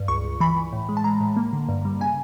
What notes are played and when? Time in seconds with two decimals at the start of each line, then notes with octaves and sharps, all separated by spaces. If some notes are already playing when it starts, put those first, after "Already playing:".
Already playing: G2
0.08 C#2 C#6
0.25 C#2
0.40 E3 B5
0.57 E3
0.73 A2
0.89 G#3
0.97 A5
1.04 G#3 A#5
1.21 A2
1.36 A#3
1.53 D3
1.69 G2
1.85 G3
2.01 C#3 G#5